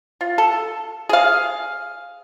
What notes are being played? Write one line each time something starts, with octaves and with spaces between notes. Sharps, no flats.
F4
A4
G#4 F5